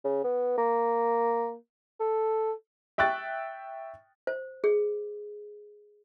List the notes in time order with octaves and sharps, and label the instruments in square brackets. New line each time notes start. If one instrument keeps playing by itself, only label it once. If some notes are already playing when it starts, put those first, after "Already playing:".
[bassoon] C#3
B3
A#3
A4
[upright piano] E5 G5 C#6 F#6 A6
[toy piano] C5
G#4